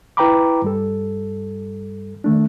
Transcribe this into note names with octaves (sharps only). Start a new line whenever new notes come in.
E4 B4 G5 A#5 B5 D6
G2 G3 A4
D#3 A3 D4